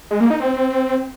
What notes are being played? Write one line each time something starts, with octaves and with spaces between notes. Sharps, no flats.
G#3
A#3
D#4
C4